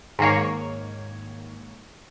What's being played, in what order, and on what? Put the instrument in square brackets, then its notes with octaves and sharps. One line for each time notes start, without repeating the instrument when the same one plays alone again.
[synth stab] G#2 D#3 A#3 C#5